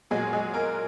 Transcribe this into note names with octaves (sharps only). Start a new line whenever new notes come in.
A#2 F#3 G#3 G#4
G#3 G#4
A#3 A#4